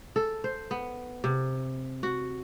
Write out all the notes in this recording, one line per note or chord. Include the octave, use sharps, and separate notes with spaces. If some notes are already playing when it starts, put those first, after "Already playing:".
A4
C5
B3
C3
F#4